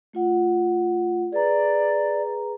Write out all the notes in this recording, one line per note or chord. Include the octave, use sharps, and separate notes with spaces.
A3 F4 F#5
G#4 B4 D5 A#5